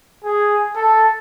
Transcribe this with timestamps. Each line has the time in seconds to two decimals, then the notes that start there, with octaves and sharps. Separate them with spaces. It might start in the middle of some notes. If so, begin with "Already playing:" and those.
0.25 G#4
0.76 A4